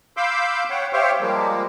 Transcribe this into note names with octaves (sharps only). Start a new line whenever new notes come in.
F5 B5 C6 D6 E6 G6
C#5 F#5 G5
G4 C5 C#5 E5 F5 G5
F3 G3 G#3 A#3